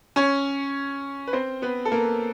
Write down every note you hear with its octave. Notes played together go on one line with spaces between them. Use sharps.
C#4 C#5
B4
C4 C5
B3 B4
A4
A#3 A#4